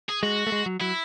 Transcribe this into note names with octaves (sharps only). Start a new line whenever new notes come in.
G#4
G#3 F#4
A3
G#3
F#3
F#3 E4